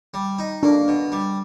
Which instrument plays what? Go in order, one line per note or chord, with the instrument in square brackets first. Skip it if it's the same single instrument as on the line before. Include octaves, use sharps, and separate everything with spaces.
[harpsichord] G3
D#4
[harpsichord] A#3 [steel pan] D4
[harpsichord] B2
G3